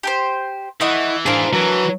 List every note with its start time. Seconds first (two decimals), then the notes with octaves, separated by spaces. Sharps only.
0.03 G4 A4 C5
0.81 E3 A3 E4 D#5 F#5
1.26 D4 G#4 A#4 C5 F5
1.53 E3 F#3 B4